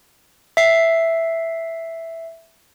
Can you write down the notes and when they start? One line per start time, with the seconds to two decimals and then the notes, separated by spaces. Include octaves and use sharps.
0.57 E5 C7